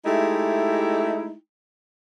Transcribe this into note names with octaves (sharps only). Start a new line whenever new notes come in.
G#3 A3 D#4 E4 G4